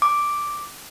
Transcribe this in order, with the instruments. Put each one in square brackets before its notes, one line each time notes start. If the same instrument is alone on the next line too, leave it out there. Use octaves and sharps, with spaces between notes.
[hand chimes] D6